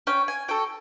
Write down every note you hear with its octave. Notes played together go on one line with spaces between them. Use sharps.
C#4 G5
G#5
F#4 A4 G5